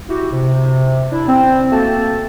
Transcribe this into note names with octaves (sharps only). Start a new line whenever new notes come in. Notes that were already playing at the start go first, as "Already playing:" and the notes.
E4 F#4 G4
C3
D4 E4
C4
A3 A#3 C4 F#4 A4 A5